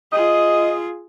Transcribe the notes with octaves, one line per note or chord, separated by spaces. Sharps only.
F4 G#4 D#5